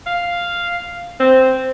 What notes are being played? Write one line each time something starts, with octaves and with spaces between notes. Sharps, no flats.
F5
C4